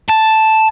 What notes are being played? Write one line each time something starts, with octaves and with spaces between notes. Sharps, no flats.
A5